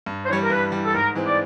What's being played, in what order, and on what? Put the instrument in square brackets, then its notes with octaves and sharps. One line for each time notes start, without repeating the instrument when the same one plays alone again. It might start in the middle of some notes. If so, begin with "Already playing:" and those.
[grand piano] G2
[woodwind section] C5
[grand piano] E3 G3 [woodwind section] C#5
[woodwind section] A#4
[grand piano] G2 [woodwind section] B4
[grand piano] E3 G3
[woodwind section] A4
[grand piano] G#2 [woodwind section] A#4
[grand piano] E3 G#3 C4
[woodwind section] D5